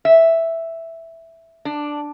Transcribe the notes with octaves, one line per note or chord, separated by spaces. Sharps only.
E5
D4